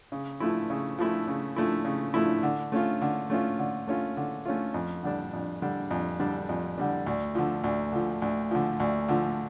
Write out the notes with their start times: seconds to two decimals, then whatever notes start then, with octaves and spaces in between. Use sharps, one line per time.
0.12 C#3
0.40 F3 A3 E4
0.70 C#3
0.99 F3 A3 E4
1.27 C#3
1.56 F3 A3 E4
1.85 C#3
2.14 F3 A3 E4
2.43 D3
2.72 A3 C#4 F4
3.02 D3
3.30 A3 C#4 F4
3.59 D3
3.88 A3 C#4 F4
4.17 D3
4.45 A3 C#4 F4
4.74 F2
5.03 D3 G3 D4
5.33 F2
5.62 D3 G3 D4
5.91 F2
6.19 D3 G3 D4
6.49 F2
6.78 D3 G3 D4
7.06 D2
7.35 D3 F3
7.64 D2
7.92 D3 F3
8.22 D2
8.51 D3 F3
8.80 D2
9.09 D3 F3